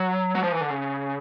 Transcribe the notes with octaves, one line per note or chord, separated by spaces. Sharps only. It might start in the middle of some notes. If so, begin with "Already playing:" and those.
Already playing: F#3
F#3
F3
E3
D3
C#3